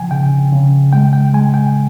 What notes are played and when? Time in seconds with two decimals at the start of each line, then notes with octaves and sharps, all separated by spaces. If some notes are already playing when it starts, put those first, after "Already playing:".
Already playing: C#3 F3 G5 G#5
0.11 C#3 G5
0.52 C#3
0.93 G#3 G5
1.13 G5
1.33 G#3 G#5
1.54 G5